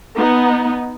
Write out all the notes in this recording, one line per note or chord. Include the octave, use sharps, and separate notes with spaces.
B3 D#4